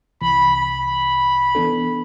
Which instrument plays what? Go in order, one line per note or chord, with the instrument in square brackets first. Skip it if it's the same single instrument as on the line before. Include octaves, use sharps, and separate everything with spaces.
[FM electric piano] C2 C3 E3 [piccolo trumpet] B5
[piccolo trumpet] B5
[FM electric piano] E3 B3 D4 A4